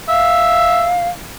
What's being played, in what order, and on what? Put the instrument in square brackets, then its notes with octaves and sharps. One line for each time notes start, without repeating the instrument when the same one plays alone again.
[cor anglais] E5 [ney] F5